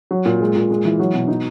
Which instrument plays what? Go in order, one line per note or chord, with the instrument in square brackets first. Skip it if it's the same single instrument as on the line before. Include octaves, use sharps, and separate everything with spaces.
[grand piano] F#3
A#2
G#3
A#2
G#3
E3
F#3
B2
D#4